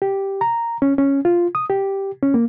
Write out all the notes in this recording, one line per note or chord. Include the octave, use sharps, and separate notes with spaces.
G4
A#5
C#4
C#4
F4
D#6
G4
C#4
A#3